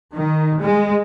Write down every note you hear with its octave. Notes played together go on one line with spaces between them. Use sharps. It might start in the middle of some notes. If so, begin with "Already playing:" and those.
D#3
G#3